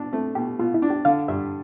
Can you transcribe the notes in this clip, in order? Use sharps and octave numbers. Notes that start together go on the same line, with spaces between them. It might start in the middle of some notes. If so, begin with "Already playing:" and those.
Already playing: B2 D4
A3 C4
B2 G4
B2 F4
E4
D4
G4
D3 F5
G2 E5